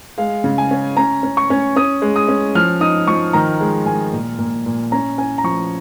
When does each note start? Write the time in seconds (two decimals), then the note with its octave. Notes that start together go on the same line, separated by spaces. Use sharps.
0.18 G#3 F5
0.44 C#3
0.58 G#5
0.71 C#4
0.96 C#4 A#5
1.23 C#4
1.37 C#6
1.50 C#4
1.76 C#4 D#6
2.02 G#3
2.16 D#6
2.28 C#4
2.55 F3 F6
2.81 D#4 D#6
3.07 F3 C#6
3.33 D#3 A#5
3.61 G#3
3.86 D#3 G#5
4.12 A#2
4.38 A#2
4.66 A#2
4.92 C#4 A#5
5.18 C#4 G#5
5.38 A#5
5.44 F3 C#6